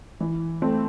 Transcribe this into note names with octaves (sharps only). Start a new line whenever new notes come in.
E3
A3 C4